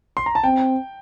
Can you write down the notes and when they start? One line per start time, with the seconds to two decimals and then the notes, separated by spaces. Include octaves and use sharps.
0.17 C6
0.26 A#5
0.35 A5
0.44 C4 G5